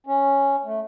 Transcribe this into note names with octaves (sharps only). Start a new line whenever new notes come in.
C#4
A3